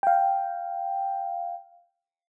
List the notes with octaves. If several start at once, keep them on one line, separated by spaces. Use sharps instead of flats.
F5 G5